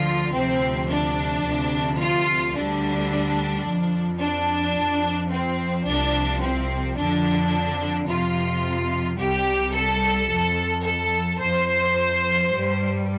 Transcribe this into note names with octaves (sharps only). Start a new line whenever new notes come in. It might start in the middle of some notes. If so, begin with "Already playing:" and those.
Already playing: D2 D3 F3 F4
D2 C3 F3 C4
D4
D2 C3 F3
F4
D2 D3 G3 D4
F2 F3
D4
F2 F3
C4
C2 C3 F3 D4
C4
F2 D3 F3 D4
F2 C3 F3 F4
C2 C3 G3 G4
A4
F2 F3
A4
F2 F3 C5
G2 G3